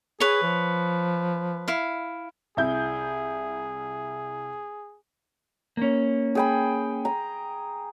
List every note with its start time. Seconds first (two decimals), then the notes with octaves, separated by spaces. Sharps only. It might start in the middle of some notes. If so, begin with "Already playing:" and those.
0.20 G#4 B4 C#5
0.43 F3
1.68 E4 F5
2.57 C2 E4 G#4 G6
5.77 A#3 C#4
6.35 G#4 G5 B5
7.05 A#5